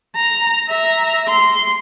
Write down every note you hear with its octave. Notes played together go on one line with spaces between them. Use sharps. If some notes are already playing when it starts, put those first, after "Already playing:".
A#5
E5 A#5
C6